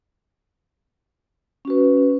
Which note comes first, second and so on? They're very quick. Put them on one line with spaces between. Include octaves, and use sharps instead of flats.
C#4 F#4 B4